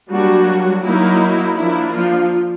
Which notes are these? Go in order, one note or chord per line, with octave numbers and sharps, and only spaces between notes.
F#3 G3 A#3 D4 F#4
F#3 A#3 D#4 E4
F3 A#3 D4 E4
F3 F4